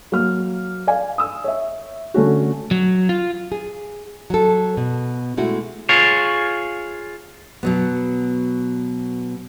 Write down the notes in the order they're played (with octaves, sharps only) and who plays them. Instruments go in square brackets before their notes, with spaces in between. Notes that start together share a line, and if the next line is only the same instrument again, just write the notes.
[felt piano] F#3 A#3 F6
D5 F5 G#5
D#6 E6
C#5 E5
D3 A3 C#4 F#4
[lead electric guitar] F#3
F4
[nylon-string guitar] G#4
F#3 A4
B2
G#3 A3 E4 F#4
[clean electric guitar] F4 G#4 C#5
[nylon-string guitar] B2 F#3 B3